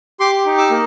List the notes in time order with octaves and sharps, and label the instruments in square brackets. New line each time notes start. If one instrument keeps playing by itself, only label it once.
[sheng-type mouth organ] G4 C6 D6
D#4
D6 E6
A#3